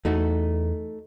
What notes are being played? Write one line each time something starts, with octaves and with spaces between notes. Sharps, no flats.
E2 A3 D#4 F#4